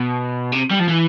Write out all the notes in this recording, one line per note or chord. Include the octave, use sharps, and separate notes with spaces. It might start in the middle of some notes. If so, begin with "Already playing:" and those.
Already playing: B2
C3
G3
F3
E3